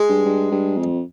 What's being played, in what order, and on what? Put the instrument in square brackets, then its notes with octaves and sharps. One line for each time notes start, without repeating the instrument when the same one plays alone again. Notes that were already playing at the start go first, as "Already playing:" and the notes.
Already playing: [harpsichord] G#3
[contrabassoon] G2
G2
G2
F2